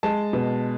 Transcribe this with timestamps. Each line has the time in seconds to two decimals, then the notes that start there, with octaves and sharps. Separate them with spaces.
0.03 G#3 A5
0.33 B2